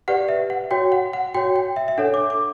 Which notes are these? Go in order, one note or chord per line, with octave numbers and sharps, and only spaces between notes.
G4 B4 D5 F#5
E5
F#5
F#4 C#5 G5
F#5
F#5
F#4 C#5 G5
G5
E5
E5
D4 A4 C#5 F#5
D6
D6